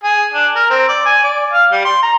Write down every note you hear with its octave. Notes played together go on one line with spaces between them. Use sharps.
G#4
D4
A#4
C4
D5
G#5
D5
F5
G3
C6
A#5